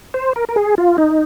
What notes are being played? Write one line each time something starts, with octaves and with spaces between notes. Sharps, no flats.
C5
A#4
A#4
G#4
F4
D#4